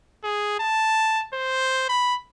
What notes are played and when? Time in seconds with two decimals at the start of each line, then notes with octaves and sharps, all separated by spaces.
0.24 G#4
0.60 A5
1.34 C5
1.89 B5